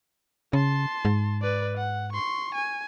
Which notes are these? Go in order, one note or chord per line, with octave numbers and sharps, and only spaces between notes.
C#3 A5 C6
G#2
B4 D5
F#5
C6 C#6
G#5